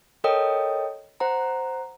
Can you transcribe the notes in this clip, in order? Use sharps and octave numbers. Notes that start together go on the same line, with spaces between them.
A4 A#4 C#5 D#5 G5 D#6
C5 F#5 A#5